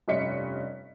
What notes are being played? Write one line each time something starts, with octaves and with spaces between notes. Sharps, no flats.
F1 G2 C#4 D#5 B6 C#7